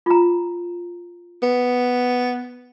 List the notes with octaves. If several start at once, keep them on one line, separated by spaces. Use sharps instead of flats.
F4 A#5
B3